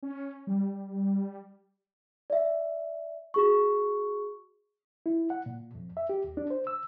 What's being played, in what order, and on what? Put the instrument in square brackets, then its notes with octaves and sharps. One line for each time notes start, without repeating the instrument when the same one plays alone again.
[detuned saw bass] C#4
G3
[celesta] D5 E5
F#4 G#4 C#6
[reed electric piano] E4
F#5
A#2
F2
E5
G4
D#2
D4
C5
E6